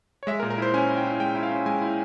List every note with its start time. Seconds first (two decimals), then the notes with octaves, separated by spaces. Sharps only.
0.23 C#5
0.27 G#3 E5
0.40 A#4
0.43 A#2
0.50 A#4
0.58 E4 C5
0.74 C#4 G#5
0.89 E4
0.97 G5
1.04 E4
1.20 G#3 G5
1.35 E4
1.43 F5
1.51 C#4
1.66 G#3 G#5
1.82 E4